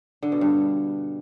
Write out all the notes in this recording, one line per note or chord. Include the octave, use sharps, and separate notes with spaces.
D3
B2
G2